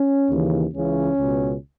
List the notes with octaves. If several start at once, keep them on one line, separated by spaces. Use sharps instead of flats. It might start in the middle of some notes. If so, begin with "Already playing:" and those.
Already playing: C#4
D#2 C#3 E3
C#2 C#3 E3 C#4
C#2 B2